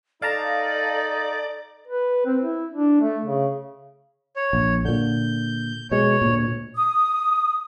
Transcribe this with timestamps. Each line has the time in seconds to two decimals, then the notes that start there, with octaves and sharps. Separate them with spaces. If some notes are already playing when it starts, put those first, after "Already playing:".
0.22 D#4 A4 D5 F5 A5 A#5
1.87 B4
2.25 C4
2.40 E4
2.72 D4
3.00 A3
3.25 C#3
4.36 C#5
4.53 A#1
4.85 A#2 D3 G6
5.91 B2 G#3 C#5
6.22 D2 A#2
6.76 D#6